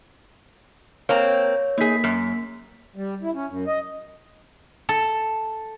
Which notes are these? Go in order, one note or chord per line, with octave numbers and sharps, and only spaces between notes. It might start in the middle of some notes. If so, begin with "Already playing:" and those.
A#3 C4 C#5 A#5
A#3 D#4 G#4 B6
F#2
G3
E4
C#4
F#2
D#5
A4